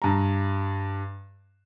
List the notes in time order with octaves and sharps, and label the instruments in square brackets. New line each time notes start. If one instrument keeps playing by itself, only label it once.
[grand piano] G2 A#5